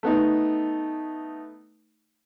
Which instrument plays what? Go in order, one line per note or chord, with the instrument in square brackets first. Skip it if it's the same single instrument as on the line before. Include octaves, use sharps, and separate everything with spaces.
[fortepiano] A3 B3 D#4